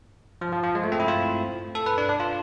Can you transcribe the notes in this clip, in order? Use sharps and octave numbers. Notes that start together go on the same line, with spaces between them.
F3
F3
F3
G#3
A3
C4
E4
F4
A4
B4
D4
D4
F4